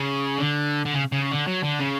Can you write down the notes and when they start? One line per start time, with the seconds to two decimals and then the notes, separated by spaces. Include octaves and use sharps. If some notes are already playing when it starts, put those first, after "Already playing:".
Already playing: C#3
0.38 D3
0.85 D3
0.94 C#3
1.12 C#3
1.32 D3
1.47 F#3
1.63 D3
1.79 C#3